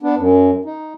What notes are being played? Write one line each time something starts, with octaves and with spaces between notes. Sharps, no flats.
B3 D4
F#2
D#4